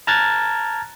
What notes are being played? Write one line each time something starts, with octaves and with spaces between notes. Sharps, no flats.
A5 A#5 F6 F#6 G#6 A6